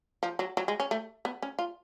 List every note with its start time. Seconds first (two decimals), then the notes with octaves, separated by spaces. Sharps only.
0.23 F3
0.39 F#3
0.57 F#3
0.68 G#3
0.80 C#4
0.91 A3
1.25 B3
1.42 C#4
1.59 F4